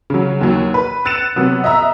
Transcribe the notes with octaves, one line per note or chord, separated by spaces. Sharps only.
C#3 F#3
D#2 F#3
B4
E6 F#6 A6 C#7 D#7 E7
C3 F#3 B3
D#5 E5 A#5 E6